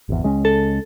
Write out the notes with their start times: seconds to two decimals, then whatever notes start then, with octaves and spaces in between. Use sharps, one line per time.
0.09 G#1 E2
0.23 C#2 G#3 C#4
0.45 A4